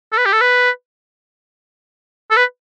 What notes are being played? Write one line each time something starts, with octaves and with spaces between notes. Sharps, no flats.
A4
B4
G4
A4
B4
A4
B4